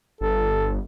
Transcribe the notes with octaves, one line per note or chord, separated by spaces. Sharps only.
G1 A4